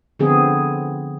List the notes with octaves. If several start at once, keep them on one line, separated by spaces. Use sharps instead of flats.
D3 F3 B3 C4 G#4